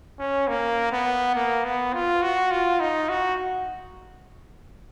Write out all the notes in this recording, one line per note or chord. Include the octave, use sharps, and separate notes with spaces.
C#4
A#3
B3
A#3
B3
F4
F#4
F4
D#4
F#4